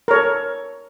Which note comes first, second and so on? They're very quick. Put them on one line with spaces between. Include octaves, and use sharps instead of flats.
A#4 C#5 A4